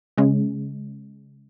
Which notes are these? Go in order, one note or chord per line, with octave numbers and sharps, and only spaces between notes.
C#3 G#3 C#4